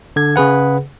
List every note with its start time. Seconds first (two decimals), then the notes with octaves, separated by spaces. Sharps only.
0.16 D3 G#6
0.36 C#3 G#4 B4 F#5